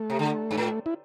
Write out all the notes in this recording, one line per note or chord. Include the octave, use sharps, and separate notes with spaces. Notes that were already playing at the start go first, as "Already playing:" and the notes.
Already playing: A3
C3
D3
G2
A2
E4